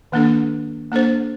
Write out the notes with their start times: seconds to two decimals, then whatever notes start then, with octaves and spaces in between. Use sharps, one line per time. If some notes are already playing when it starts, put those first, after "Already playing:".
0.12 D#3 A#3 D4 A4
0.92 A#3 D4 A4 C5